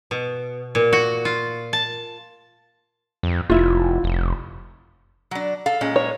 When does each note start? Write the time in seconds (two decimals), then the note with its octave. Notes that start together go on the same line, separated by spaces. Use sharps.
0.11 B2
0.75 A#2
0.93 F#4
1.25 F4
1.73 A5
3.23 F2
3.50 F1 E4 F4
4.04 F1
5.31 F#3 D4
5.66 A4 F5
5.81 A#2 G#3 C#4
5.96 C#5